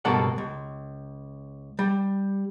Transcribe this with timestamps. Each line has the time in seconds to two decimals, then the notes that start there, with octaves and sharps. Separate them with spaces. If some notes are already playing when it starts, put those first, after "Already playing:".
0.05 C#2 G2 B2 A#3 A4 F#5
0.38 C#2
1.79 G3